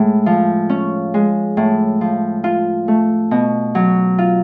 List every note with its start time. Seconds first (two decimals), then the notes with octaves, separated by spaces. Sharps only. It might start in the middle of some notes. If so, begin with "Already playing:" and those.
Already playing: A2 G#3
0.26 F3
0.70 C#4
1.14 G#3
1.57 A2
2.01 F3
2.44 F4
2.88 A3
3.31 B2
3.75 F#3
4.18 F4